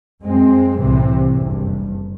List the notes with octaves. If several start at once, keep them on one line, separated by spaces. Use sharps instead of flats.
F#2 G#3 C4
C2 A2 C3 E3
F#1 G2